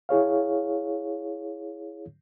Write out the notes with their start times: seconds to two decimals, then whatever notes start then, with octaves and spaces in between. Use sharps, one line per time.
0.09 E4 G#4 C#5 F5